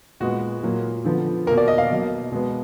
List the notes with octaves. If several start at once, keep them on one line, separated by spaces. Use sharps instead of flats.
A#2 G#3 B3 F#4
A#2 F#3 A#3
D3 F3 B3
B2 A#3 A#4
D5
D#5
F5
B2 F#3 A#3
B2 G#3 B3